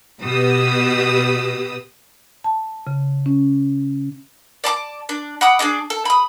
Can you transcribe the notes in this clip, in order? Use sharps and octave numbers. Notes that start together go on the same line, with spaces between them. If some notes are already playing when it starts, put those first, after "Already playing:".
B2 F#4 G4 B4 D#6 E6
A5
C#3
C#4
D5 A5 C6 D6
D4
F#5 B5 D6 D#6
D4 G#4 D5 D#5
A4
B5 D#6